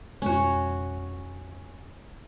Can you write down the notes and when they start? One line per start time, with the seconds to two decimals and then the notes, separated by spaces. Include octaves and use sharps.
0.22 F2 B2 G#3 C#4 F#4